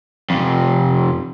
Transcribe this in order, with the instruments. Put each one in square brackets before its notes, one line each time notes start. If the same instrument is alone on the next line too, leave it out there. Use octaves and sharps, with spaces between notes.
[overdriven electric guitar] F2 C3